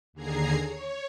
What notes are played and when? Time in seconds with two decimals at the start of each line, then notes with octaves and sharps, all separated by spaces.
0.13 D#2 D3 G#4 A#5 G#6 C7
0.64 C#5